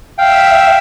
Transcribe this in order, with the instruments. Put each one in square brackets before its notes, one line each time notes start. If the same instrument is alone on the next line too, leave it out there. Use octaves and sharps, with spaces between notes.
[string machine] E5 [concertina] F5 G5